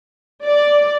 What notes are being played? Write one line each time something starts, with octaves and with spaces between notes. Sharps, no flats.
D5